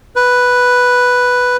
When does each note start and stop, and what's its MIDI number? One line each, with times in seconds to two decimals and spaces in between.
0.16 1.57 71